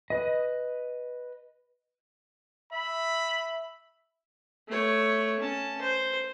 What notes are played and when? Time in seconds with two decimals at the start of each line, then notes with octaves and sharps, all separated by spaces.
0.10 B4 D#5
2.72 E5 B5
4.69 A3 C#5
5.39 C#4 A5
5.82 C5